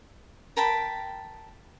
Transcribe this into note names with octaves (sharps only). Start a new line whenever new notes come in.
A#4 G5 A5 B5